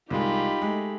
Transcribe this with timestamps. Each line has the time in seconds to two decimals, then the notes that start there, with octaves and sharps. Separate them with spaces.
0.10 C2 G#3 D#4 F4 G4 B5
0.61 G#3 A3